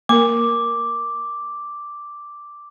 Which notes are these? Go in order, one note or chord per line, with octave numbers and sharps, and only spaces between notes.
A#3 A#4 D6